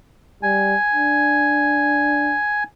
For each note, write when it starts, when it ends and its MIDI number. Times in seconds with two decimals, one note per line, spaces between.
0.43 0.75 55
0.43 2.64 80
0.93 2.36 62